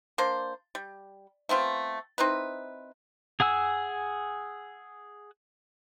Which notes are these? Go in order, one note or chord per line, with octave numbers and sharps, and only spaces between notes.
A#3 D4 C5
G3
A3 B3 C4 F4
C4 D#4 E4 B4
G#4 F#5 G#5 E6